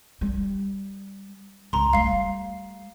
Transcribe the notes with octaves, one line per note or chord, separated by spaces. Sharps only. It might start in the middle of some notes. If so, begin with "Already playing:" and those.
G3
C#2 A#5 C6
G3 A3 F5 C7